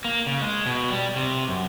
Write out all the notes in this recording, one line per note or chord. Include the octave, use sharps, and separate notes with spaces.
A#3
C#3
G#3
B2
G3
C3
F#2